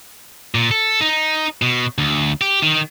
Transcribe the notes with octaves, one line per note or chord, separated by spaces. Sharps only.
A#2
A4
D#4
B2
D2
G4
D#3